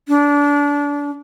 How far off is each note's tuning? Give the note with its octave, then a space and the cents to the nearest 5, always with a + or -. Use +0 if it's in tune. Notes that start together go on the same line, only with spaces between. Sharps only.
D4 -25